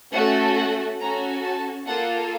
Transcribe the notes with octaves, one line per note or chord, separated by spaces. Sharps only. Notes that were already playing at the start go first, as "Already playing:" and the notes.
A3 C#4 F#4 A4 F#5
F#5
C#4 F#4 A4 A#5
A5
A#3 F4 A4 F#5